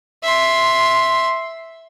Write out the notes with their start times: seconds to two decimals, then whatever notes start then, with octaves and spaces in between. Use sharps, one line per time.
0.24 E5 C6